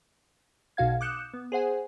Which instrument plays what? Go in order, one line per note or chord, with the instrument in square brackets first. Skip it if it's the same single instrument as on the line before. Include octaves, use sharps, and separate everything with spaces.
[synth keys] B1 B2 F#4 F5 G#6
D6 D#6 F#6 G6 C#7 E7
B3
G#4 C5 F#5 G#5